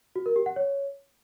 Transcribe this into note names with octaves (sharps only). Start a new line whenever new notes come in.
F#4
A#4
G4
F#5
C#5